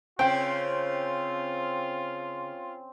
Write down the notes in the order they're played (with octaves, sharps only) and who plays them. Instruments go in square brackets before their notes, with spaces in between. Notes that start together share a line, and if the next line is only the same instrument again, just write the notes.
[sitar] C#3 [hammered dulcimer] C4 [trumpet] F4 [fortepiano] G5